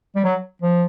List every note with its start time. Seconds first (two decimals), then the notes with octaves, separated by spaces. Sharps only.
0.16 G3
0.24 F#3
0.62 F3